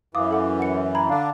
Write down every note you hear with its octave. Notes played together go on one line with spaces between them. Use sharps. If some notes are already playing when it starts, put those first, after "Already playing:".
F#2 E3 F5 D6 D#6
A4 F#5 D6
F#5 C#7
A#5 B5 G#6
D3 D4 F5